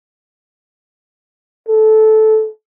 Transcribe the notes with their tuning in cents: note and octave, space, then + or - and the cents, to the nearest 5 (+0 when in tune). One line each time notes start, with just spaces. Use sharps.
A4 -15